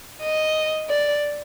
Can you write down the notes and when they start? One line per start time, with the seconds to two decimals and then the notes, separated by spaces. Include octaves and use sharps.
0.22 D#5
0.89 D5